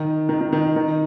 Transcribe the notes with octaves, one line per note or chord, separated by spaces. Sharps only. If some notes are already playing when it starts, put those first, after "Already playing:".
Already playing: D#3
D#3
D#3
D#3
D#3